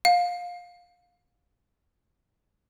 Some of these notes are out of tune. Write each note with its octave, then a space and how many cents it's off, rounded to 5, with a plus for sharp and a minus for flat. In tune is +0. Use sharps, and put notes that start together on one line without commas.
F5 +20